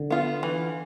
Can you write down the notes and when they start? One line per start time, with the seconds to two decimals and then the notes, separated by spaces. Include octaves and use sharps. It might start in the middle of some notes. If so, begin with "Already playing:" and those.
Already playing: D3
0.10 B3 F4
0.43 E3